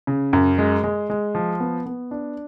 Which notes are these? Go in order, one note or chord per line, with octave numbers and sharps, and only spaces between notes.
C#3
F#2
G#3
G#3
G#3
F3
B3
B3
D4